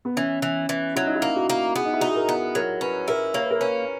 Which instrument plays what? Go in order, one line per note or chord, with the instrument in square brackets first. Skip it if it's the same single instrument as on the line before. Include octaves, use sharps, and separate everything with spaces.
[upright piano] B3
[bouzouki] E3 [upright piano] C#4
[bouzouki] E3
E3
[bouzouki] F#3 [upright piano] E4
[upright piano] D#4
E4
[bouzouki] A#3
[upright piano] F#4
[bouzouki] A#3
[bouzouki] B3 [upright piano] G#4
[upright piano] D#4
E4
[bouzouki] D#4 [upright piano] F#4
[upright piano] G#4
A#4
[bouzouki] B3
[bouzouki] F#3 [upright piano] A#4
[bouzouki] C#4 [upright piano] B4
[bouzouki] E4 [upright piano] A#4
[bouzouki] A#3 [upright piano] C#5
[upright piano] B4
A#4
[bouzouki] C#4 [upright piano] B4